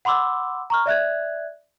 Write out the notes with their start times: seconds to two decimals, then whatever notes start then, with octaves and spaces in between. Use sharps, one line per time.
0.05 F#5 B5 C6 D6 E6
0.70 A#5 C#6 F6
0.86 D5 E5 F#6 G#6